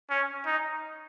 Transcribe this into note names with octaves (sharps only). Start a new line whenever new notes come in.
C#4
D#4